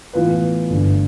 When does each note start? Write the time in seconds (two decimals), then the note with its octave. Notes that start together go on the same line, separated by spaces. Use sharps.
0.13 A2 E3 B3 F4 B4
0.70 G1 G2 D3 A3